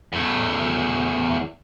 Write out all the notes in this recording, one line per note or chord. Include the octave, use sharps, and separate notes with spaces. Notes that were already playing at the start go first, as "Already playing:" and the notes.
E2 A3